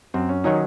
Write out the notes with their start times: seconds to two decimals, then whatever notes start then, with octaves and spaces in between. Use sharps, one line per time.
0.14 F#2 C4
0.29 C#4
0.44 D#3 F#3 C#4 D#4